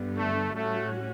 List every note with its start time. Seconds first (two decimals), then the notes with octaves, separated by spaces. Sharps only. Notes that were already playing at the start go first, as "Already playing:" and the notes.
Already playing: G2 D3 G3 B3
0.17 A3
0.54 A2 G3 A3 C#4 F#4